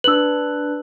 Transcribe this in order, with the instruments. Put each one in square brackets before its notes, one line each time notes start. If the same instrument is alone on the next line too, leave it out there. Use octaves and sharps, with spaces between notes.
[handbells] D4 B4 [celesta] E6 F#7